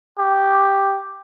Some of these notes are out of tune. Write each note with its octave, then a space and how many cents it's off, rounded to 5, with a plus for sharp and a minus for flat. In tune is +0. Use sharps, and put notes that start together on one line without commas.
G4 +0